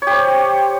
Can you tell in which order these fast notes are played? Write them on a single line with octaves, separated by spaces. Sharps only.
C#5 G4 C5